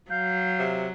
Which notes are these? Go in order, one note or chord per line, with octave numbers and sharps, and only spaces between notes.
F#3 F5 G6
C3